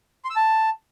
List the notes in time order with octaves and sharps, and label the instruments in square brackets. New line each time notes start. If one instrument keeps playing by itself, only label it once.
[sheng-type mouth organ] C6
E6
A5